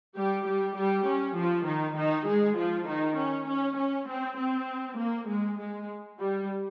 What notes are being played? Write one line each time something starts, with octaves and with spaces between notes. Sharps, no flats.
G3 G4
G3 G4
G3 G4
C#4
F3 F4
D#3 D#4
D#3 D#4
G#3 G#4
F3 F4
D#3 D#4
C#4
C#4
C#4
C4
C4
A#3
G#3
G#3
G3